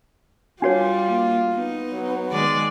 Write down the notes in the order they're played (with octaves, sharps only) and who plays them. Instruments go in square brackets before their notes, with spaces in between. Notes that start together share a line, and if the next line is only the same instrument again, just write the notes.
[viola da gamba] G3 [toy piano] D4 F#4 C#5 [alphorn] F4
[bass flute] A#3
[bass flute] B3 [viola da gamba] D#4
[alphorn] F#3
[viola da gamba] D#3 G#3 D5